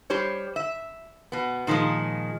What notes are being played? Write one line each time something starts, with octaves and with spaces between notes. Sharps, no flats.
G3 G4 C5 C#5
E5
B2 B3
A#2 D#3 F3 G3 G#3